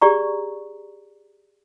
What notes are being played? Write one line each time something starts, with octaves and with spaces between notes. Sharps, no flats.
G4 G#4 D5 A#5 C#6